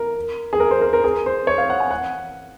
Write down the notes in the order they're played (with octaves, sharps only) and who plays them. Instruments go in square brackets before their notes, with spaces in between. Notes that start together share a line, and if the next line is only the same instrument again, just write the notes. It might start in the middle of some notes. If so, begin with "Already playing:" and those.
Already playing: [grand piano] A#4
G#4
A#4
C5
A#4
A#4
G#4
C5
C#5
F5
F#5
G#5
F#5